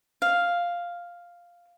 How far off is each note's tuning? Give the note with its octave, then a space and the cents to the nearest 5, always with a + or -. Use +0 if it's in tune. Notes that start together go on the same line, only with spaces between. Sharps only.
F5 +0